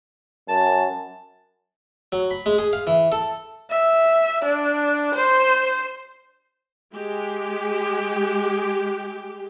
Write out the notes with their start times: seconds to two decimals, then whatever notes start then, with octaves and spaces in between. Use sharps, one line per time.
0.48 F#2 A5
2.12 F#3
2.31 B5
2.46 G#3
2.58 G#4
2.73 F5
2.87 E3
3.12 A4
3.70 E5
4.45 D4
5.15 C5
6.94 G#3 G4